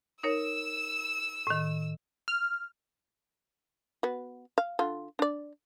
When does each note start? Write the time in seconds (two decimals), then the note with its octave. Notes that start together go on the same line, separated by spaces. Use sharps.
0.23 D#4 A#4 C#5 E6 E7
1.47 A2 D#3
2.28 F6
4.03 B3 F#4
4.58 F5
4.79 D3 F4
5.19 D4 D5